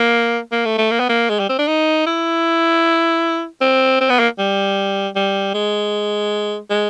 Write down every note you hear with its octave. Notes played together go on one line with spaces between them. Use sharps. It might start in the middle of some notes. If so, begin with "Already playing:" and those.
Already playing: A#3
A#3
A3
A3
A#3
B3
A#3
G#3
G3
C4
D4
D#4
E4
C4
C4
B3
A#3
G3
G3
G#3
G#3